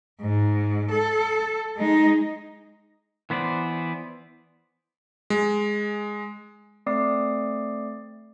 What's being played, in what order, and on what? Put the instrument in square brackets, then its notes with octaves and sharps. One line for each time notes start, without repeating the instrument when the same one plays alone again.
[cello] G#2
A4
G#3 D#4
[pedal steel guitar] E3 B3 C5 D5
[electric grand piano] G#3
[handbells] A3 C4 D5 D6 D#6 C7